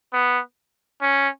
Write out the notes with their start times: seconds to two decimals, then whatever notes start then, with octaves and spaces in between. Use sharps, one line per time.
0.13 B3
1.02 C#4